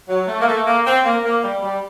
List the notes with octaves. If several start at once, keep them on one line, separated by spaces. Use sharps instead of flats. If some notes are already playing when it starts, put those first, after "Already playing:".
F#3
A3
A#3
A3
A#3
C4
A#3
A#3
G3
G3